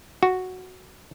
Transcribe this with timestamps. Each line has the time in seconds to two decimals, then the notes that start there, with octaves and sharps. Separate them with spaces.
0.23 F#4